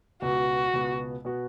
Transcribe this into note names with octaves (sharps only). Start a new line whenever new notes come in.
C#2 B2 B3 F#4
C#2 B2 B3
B2 B3 F#4